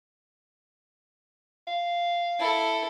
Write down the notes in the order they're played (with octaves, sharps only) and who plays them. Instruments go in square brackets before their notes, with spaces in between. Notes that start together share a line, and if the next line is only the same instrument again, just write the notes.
[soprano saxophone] F5
[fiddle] E4 A4